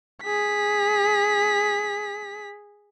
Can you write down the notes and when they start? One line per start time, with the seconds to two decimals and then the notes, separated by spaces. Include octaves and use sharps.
0.23 G#4 B6